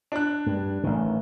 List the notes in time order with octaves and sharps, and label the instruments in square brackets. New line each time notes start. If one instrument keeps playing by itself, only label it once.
[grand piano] D4 F#6
[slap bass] G2
A1 D#3